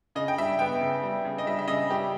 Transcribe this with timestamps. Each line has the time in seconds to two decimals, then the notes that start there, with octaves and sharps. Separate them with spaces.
0.15 C#3 D#5
0.28 G5
0.38 G3 E5
0.59 B3 G5
0.81 C#3
1.02 G3
1.25 C#3
1.38 D#5
1.47 G3 E5
1.59 E5
1.68 C#3 D#5
1.90 G3 G4